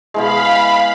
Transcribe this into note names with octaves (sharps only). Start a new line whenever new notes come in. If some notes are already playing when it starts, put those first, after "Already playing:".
B2 E3 G#3 F5 B5